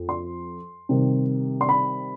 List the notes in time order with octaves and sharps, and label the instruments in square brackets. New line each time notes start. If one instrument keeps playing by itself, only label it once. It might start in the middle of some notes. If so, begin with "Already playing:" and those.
Already playing: [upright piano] F2
C6
C3 D#3 G3
C6
B5